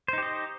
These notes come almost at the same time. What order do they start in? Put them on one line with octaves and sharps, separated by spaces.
C5 D#4 G4 D#5